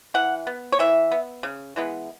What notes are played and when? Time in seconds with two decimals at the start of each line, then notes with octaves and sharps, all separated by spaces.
0.14 E3 F#5
0.47 B3
0.72 C#5
0.79 E3 E5
1.12 B3
1.43 C#3
1.76 E3 G#3 B3